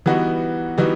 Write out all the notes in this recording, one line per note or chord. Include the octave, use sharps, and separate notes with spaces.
E3 G3 B3 D#4 F#4
E3 G3 B3 D#4 F#4